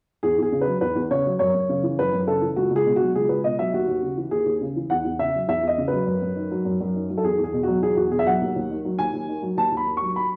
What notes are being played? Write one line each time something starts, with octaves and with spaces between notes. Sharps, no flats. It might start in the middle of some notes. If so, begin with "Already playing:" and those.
E2 G#4
E2 G#4
C#3
B4
F#3
E2 B4
E2
C#3 C#5
F#3
F#2 C#5
F#2
C#3
E3
F#2 B4
F#2
C#3 A4
E3
C#2 F#4
C#2
G#4
B2
F#3 F#4
C#2 G#4
C#2 B4
B2 D#5
F#3 E5
D#2 F#4
D#2
C#3
E3
D#2 G#4
D#2
C#3
E3
E2 F#5
E2
C#3 E5
F#3
E2 E5
E2 D#5
C#3
F#3 B4
F#2
F#2
D#3
F#3
F#2
F#2
D#3
F#3
A4
E2 G#4
E2
G#4
B2
F#3 F#4
E2 G#4
E2 F#4
B2 G#4
E5
F#3 F#5
D#2
D#2
D#3
F#3
D#2 G#5
D#2
D#3
F#3
D#2 A5
D#2
B5
D#3
F#3 C#6
B5